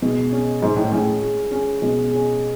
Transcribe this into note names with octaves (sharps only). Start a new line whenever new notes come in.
B2 G#3
C#4 G#4
G#2 G#3
A2
A2 C#4 G#4
G#3
C#4 G#4
B2 G#3
C#4 G#4